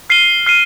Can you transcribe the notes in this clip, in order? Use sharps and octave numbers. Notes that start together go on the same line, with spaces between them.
F6 C7 D#7 G7
F6 C7 D#7 G7